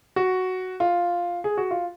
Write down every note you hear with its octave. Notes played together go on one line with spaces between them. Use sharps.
F#4
F4
G#4
F#4
F4